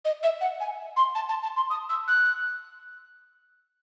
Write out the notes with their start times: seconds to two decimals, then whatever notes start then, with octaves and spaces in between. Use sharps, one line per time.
0.05 D#5
0.23 E5
0.41 F#5
0.60 G#5
0.96 C6
1.15 A5
1.29 A5
1.42 A5
1.56 C6
1.70 D#6
1.89 E6
2.07 F#6